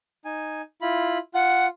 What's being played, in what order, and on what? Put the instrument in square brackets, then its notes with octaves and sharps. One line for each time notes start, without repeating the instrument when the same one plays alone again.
[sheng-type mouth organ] D#4 G#5
E4 F4 B5
[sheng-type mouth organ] F4 [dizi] F#5